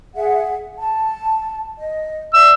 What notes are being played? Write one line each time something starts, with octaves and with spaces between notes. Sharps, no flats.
G#4 E5 F#5
A5
D#5
D5 E5 E6